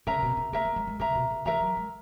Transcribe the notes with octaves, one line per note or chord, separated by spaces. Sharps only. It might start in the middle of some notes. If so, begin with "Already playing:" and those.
C#3 A#4 E5 A#5
B2
C#3
A#3 A#4 E5 A#5
A#3
G#3
G#3
C#3 A#4 E5 A#5
B2
C#3
E3 A#4 E5 A#5
F#3
G#3